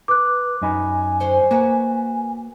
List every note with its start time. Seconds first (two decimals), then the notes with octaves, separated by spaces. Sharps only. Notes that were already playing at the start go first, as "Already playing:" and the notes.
0.08 B4 D6 F#6
0.62 F#2 D#4 G#5 B5
1.20 D3 C5 C#5
1.51 A#3 F#4 B4 C#5